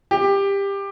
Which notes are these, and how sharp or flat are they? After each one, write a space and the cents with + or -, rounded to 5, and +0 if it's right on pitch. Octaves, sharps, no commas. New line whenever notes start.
G4 +20